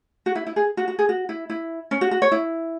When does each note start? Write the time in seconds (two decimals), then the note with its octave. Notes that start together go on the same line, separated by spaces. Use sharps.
0.26 F#4
0.35 E4
0.46 E4
0.56 G#4
0.77 F#4
0.88 F#4
0.99 G#4
1.09 F#4
1.29 E4
1.50 E4
1.91 C#4
2.01 F#4
2.11 F#4
2.22 C#5
2.32 E4